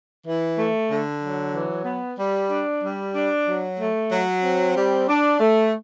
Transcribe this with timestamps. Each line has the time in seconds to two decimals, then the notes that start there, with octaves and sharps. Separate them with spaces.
0.25 E3
0.57 A3
0.88 D3
1.20 F#3
1.53 E3
1.85 B3
2.18 G3
2.50 D4
2.82 G3
3.14 D4
3.46 F#3
3.79 A3
4.11 F#3
4.43 C4
4.76 G3
5.08 D4
5.40 A3